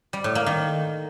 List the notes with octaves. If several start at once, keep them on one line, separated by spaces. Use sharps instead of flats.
G3
A2
A#3
D#3